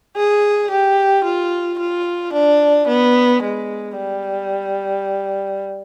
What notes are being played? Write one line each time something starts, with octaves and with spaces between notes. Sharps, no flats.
G#4
G4
F4
F4
D4
B3
G#3
G3